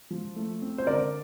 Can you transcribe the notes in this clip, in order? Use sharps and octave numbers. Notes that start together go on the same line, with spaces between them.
F3
A3
C4
C5
D3 A#4 D5